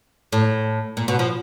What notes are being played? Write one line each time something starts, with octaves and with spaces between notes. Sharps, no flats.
A2
A#2
B2
F3